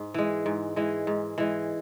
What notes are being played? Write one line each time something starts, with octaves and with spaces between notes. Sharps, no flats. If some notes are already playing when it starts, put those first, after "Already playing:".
Already playing: G#2
E3 G#3
G#2
E3 G#3
G#2
E3 G#3